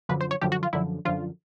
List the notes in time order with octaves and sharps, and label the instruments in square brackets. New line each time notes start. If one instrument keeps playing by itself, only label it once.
[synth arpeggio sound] F#2 D3 F3 B4
C5
C#5
F#2 D3 F3 G4
F#4
F4
F#2 D3 F3 E4
F#2 D3 F3 F4